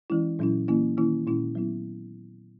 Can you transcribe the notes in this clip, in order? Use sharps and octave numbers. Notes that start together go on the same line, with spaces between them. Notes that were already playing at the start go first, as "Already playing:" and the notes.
E3 G#3 C#4 E4
A#2 F#3 C#4 E4
E3 A#3 C#4 E4
D#3 A#3 C#4 E4
A#2 G#3 C#4 E4
F#3 B3 E4